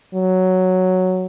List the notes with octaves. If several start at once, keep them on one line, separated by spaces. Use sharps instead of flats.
F#3